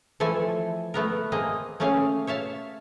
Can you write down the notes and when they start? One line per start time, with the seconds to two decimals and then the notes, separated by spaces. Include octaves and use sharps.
0.20 E3 F3 A3 A4 G#5
0.94 A3 B3 A#4
1.32 A#3 C4 G#4 D#5
1.80 A3 A#3 C#4 G#4 F5
2.27 C#5 E5 F5 A5